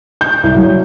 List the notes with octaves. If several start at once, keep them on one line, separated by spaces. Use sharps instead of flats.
G6
C2
F#3